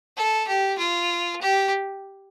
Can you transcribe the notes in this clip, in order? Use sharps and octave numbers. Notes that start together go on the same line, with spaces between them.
A4
G4
F4
G4